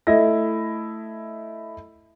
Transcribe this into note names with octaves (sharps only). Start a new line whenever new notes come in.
A3 E4 D#5 A#6